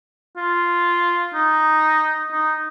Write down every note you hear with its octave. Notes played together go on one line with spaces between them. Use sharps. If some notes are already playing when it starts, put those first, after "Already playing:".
F4
D#4
D#4